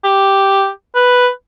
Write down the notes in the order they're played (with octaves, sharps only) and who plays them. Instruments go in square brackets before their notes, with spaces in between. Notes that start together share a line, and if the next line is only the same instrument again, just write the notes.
[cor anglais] G4
B4